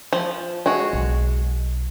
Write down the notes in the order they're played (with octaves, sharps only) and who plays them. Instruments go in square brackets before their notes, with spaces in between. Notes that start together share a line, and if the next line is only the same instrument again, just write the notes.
[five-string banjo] F3
G#3 F#4
[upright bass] B1